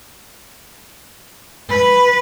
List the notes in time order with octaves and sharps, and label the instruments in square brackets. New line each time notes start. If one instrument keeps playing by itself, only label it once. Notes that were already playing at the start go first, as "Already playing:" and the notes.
[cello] B4